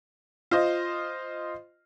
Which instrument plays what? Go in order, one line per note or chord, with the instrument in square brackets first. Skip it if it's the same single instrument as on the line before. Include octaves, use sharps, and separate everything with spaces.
[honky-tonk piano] F4 C5 D#5